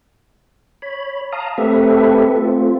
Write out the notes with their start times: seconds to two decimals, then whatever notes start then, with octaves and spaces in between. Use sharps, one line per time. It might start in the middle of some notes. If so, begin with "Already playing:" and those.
0.82 C#5 B5
1.32 F5 A5 A#5 D#6
1.58 A3 C4 G4 A4 B4 E5
2.36 A3 C4 F4